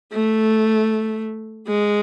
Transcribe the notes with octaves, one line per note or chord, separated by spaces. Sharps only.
A3
G#3